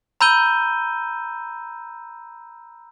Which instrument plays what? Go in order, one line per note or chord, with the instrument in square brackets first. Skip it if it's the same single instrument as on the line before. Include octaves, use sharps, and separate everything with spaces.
[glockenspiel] A#5 B5 E6 G6 D#7 G7